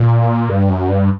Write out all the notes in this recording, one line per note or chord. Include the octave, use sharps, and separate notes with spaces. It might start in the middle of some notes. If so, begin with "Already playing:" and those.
Already playing: A#2
G2
F#2
G2